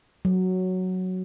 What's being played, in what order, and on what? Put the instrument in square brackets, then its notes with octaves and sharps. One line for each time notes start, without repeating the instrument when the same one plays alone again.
[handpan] F#3